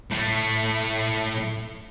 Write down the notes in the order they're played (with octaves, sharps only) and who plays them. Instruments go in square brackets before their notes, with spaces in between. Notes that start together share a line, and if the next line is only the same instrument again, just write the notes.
[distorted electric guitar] A2 A3